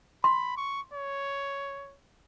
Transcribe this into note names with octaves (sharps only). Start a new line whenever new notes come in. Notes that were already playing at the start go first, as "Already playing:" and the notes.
B5 C6
C#6
C#5